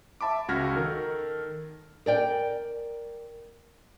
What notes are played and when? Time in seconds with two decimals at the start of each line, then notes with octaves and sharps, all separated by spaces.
0.21 E5 A5 B5 D6
0.48 C#2 F#4 F6 G#6 A#6 B6
0.76 D#3 A4 A#4
2.06 A#4 D5 G5